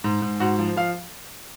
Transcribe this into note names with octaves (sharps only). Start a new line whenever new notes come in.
G#2
G#2
G#2 F#4
F3
F3 F5